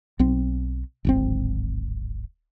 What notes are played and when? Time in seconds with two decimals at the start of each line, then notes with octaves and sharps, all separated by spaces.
0.19 B1 C4
1.05 D1 G#1 C4